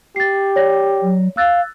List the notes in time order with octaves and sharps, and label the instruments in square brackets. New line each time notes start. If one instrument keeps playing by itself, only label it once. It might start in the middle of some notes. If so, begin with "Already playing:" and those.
[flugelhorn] G4 [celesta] A6 C7
[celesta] C#5 D5 A#6
[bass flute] F#3
[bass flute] F5 [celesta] E6 F#6 A6